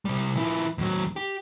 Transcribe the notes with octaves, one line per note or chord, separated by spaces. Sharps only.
C3 G3
F3 E4
D#2 F#3
G4